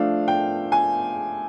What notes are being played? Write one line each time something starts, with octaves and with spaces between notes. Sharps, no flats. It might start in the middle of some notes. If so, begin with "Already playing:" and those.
Already playing: F3 A3 D4 F5
G5
G#5